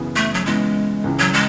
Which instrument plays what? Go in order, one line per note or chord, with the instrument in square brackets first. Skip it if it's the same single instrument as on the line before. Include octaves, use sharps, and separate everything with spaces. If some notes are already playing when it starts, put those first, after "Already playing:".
Already playing: [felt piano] F#2 C#3 E3 B3
[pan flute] A3
F#3
[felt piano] C#3 E3 B3 [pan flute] G#3
[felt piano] C#2 C#3 E3
[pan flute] F#3
G#3